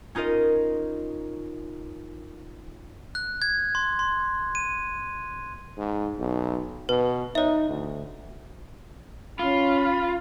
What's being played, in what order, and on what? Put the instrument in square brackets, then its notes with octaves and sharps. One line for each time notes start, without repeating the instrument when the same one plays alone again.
[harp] C#4 D#4 F4 A#4 D#5
[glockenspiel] F#6
G#6
C6
C6
D#7
[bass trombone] G#2
B1
[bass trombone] B2 [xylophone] B4
[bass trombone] D#4 [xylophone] C#5 E5
[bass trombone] D2
[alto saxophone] C#4 [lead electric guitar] F4 [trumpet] B5